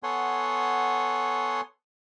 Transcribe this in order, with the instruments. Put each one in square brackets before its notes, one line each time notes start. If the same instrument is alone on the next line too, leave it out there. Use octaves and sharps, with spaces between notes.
[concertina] B3 A4 C#5 F#5 G#5 C6